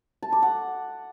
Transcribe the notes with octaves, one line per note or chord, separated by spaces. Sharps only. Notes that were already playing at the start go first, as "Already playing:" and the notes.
A5
D6
F#5